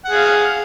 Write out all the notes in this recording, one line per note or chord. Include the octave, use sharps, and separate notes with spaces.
G#4 F5 F#5